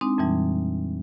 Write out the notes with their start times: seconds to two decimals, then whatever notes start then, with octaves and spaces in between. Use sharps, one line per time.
0.01 G#3 C4 D4 D#4
0.18 F2 A#2 E3 G3